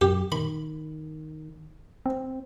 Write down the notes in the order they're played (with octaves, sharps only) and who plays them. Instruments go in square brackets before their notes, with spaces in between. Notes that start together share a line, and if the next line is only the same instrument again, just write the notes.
[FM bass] F#2 [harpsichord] G4
[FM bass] D#3 [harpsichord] B5
[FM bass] C4